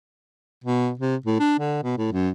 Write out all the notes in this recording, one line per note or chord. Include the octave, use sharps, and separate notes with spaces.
B2
C3
A2
D4
D3
B2
A2
F#2